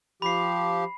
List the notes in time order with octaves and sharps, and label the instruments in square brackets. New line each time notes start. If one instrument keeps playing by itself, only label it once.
[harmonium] F3 G4 [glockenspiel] B5 C7